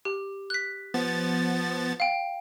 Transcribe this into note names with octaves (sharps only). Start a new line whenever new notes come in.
G4
F#6 B6
F3 B3 A6
F5 G5